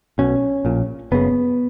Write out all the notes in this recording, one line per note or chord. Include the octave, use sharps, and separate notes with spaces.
B1 B2 C#4
A#1 A#2
F#1 F#2 C#3 B3